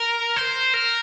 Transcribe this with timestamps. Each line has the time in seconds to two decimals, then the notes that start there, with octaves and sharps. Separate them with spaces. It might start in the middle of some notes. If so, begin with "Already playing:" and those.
Already playing: A#4
0.36 C5
0.74 A#4